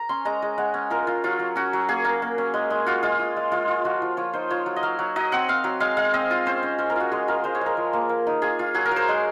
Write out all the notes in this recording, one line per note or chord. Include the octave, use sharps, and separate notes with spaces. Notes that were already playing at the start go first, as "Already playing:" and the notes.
Already playing: A#5
C#4 C6
G#3 A#5
G#3
G#3 F#5
C#4
F4 A#4
F4
F#3 F4
F#3
C#4 F#4
F#3
A#3 G#4
A#3
A#3
C#4
G#3
G#3
F4 F#4
G#3 F4
F4
G#3
G#3 F4
F4
F3 F#4
F3
F3 C#5
D#4 C5
F4 C#5
F#3
D#5
F#3 F5
F#3
F#3 D#5
C4 F#5
C4 F5
F#3
G#3 F5
G#3 F5
C4 D#5
F4
C#4 C5
C#4
C#4 C5
A#4
F4 F#4
G#3 G#4
F4 A#4
G#3 C5
C#5
G#3 A#4
F3
A#3
A#3
D#4
F4 G#4
F4
F#3 G#4
A#4
F#3 C5
G#3